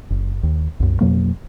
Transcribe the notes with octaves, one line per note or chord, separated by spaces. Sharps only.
F#1
D#2
C2 F#2
F2 B2 F#3 A#3